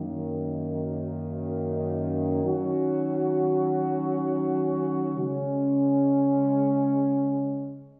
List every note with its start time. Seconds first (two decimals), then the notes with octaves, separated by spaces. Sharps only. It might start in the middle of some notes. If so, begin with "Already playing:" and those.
Already playing: F#2 D#3 A#3
2.44 D#3 F#3 C#4 F#4
5.15 C#3 G#3 C#4